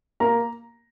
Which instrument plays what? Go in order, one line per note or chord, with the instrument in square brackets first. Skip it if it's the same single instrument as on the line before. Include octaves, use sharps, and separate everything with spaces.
[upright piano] A#3 A#5